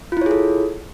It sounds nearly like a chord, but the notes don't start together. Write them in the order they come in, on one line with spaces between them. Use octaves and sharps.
F4 E4 C#5 G#4 A4